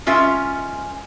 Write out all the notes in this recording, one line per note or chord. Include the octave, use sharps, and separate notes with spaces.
G#3 C#4 F4 A#4 E5